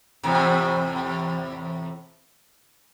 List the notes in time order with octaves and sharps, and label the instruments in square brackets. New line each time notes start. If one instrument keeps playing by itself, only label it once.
[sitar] E2 A2 C3